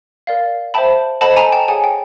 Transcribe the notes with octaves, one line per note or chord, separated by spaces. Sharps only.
A#4 D5 F5
C5 E5 G5 A5 B5
A4 C5 D#5 F#5 A5 B5
G#5 A#5
G5 A5
G#4 C#5 F#5 G#5
G5